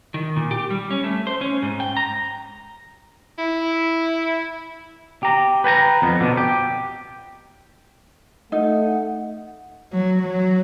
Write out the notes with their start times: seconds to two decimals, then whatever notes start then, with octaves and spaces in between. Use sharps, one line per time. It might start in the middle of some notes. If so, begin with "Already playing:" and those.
0.14 D#3
0.36 A#2
0.51 G4
0.70 G3
0.91 C#4
1.04 A3
1.27 C5
1.41 C#4
1.62 G#2
1.80 G5
1.97 A#5
3.39 E4
5.23 G4 A#5
5.64 B4 G5 A5 A#5
6.02 F2 B3
6.20 B2 D3
6.37 G4
8.52 A3 D#4 F#5
9.91 F#3
10.21 F#3